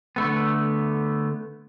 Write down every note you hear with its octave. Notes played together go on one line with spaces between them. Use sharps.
D3 A3 B3